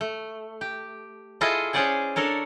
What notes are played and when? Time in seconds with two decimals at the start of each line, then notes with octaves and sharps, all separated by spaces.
0.01 A3
0.61 G4
1.41 E4 F4 G#4 A4 D#5
1.73 C#4 G#4 C5 D5 F#5 G#5
2.16 D4 A4 A#4 C#5